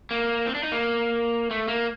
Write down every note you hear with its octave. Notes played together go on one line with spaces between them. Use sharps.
A#3
C4
D4
D#4
A#3
A3
A#3